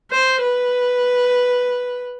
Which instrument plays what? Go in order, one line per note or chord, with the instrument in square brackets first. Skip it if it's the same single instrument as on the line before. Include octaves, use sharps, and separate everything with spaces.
[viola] C5
B4